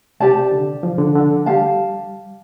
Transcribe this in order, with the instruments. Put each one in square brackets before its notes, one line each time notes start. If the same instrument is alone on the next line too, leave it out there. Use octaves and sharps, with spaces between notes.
[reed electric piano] C3 [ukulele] G4 D5 A5
[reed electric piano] D3
F3
D3
D3
[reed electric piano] G3 [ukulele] G4 F5 A5